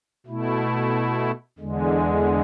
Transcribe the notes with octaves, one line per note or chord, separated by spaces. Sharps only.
B2 A3 E4
E2 D3 G#3